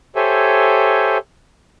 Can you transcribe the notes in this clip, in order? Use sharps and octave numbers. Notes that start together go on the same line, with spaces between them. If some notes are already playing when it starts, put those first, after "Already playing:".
G4 A4 C5 C#5 E5 G#5